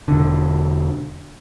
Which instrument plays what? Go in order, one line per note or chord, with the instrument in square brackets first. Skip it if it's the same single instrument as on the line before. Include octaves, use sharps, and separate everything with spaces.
[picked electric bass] E1 D3